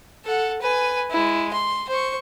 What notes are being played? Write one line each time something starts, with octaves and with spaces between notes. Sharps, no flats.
A4 F#5
B4 G#5
G#3 E4
C6
C5 C#6